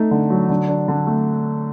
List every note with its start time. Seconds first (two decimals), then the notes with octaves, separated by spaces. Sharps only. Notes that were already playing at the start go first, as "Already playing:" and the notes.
Already playing: A3 D#4
0.11 D3
0.30 F#3
0.49 D3
0.68 D4
0.88 D3
1.07 A3